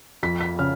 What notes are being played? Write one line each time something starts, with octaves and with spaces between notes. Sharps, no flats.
F2 B6
B6
C#3 F6